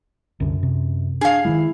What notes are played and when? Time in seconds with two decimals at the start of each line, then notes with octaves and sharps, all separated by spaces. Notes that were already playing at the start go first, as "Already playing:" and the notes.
0.40 C2 F#2 D3
0.63 C3
1.21 D4 G#4 F5
1.45 D#3 E3 G#3 E4